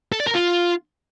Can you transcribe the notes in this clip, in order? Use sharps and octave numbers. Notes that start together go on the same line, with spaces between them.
A4
D5
A#4
F4